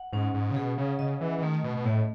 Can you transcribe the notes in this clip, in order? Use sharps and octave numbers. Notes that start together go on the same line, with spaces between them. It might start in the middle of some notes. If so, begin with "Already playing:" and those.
Already playing: F#5
G#2 C#4
G#2
C#3
B2 G#4
C#3
C#3 D#5
E3
E3
D#3 A3
B2
B2
A2 A3